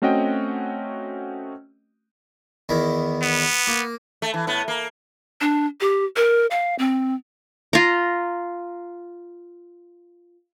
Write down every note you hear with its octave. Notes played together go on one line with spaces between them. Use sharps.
A3 C4 C#4 F#4 D#5 G5
E2 D#3 E4
B3
A#3
A3
E3
A2 B3
A#3
D4
G4
A#4
F5
C4
F4 A#5